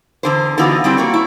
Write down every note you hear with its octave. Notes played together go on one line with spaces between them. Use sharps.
E2 D3 C5
D3 E3 B3 D#4 F4 F#4
G3 C4 D4 E4
A#3 F#4 C#5
E4